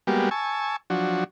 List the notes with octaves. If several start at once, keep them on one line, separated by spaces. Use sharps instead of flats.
G3 G#3 A#3 B3 F#4 G4
G#5 A5 C#6 E6
F3 F#3 D4 F#4